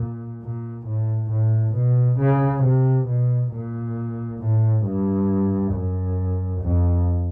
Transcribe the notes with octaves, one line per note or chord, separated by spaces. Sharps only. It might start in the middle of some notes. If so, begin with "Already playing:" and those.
Already playing: A#2
A#2
A2
A2
B2
C#3
C3
B2
A#2
A2
G2
F#2
F2